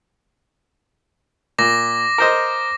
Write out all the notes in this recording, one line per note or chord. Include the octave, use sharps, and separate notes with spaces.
A#2 D6 A#6
A#4 C5 D#5